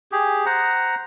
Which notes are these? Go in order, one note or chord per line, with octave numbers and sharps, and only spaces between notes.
G4 G#4
C5 F#5 A#5